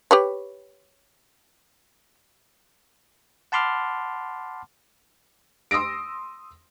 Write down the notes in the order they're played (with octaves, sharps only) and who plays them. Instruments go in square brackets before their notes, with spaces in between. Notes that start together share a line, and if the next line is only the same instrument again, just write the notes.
[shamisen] G4 B4 C#5
[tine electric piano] F#5 A5 B5 C6 D6 F6
[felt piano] C6 D#6 E6 A#6 D7